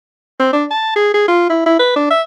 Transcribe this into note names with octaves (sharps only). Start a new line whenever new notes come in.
C4
D4
A5
G#4
G#4
F4
E4
E4
B4
D4
E5